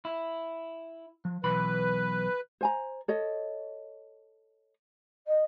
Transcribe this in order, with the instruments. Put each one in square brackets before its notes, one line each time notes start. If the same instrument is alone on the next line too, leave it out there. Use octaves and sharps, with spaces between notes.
[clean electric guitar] E4
F3
[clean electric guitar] B1 E3 B5 [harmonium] B4
[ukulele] C5 G#5 A#5
A4 C#5 D#5
[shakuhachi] D#5